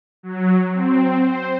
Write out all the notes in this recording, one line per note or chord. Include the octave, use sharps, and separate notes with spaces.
F#3
C4
C5